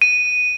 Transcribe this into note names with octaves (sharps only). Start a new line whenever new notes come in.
D#7